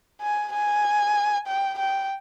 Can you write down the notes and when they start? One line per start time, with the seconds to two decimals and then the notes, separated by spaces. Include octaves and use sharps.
0.21 G#5
0.53 G#5
1.47 G5
1.79 G5